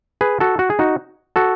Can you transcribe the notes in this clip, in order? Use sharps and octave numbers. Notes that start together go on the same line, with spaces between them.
G#4 B4
F#4 A4
F#4
G#4
D#4 F#4
F#4 A4